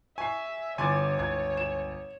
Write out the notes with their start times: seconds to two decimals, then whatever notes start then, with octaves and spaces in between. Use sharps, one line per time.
0.18 E5 G#5 C#6 C7
0.78 G1 D3 C#5 G#5 C6 D6 A6
1.19 C#2 G#6
1.57 E7